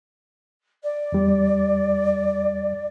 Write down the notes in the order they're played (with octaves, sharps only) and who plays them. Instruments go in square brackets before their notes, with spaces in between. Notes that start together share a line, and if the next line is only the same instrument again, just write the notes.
[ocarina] D5
[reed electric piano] E2 G3